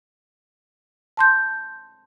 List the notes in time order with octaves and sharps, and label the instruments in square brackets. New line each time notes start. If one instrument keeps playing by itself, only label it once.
[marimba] A5 C6 G6